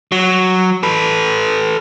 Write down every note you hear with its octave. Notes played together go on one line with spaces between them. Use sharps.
F#3
A4 B4